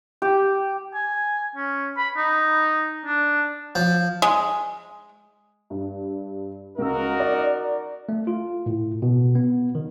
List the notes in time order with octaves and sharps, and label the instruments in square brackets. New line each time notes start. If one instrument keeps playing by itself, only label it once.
[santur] G4
[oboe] G#5
C#4
B5
D#4
D4
[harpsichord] F3
[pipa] G#3
[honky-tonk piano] G2
[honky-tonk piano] C#2 E6 [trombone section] D#4 F#4 A#4
[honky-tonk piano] D5
[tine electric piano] A3
F4
A2
B2
B3
D#3